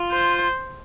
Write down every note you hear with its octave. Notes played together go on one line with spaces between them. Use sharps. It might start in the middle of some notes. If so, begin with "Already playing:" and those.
Already playing: F4
C5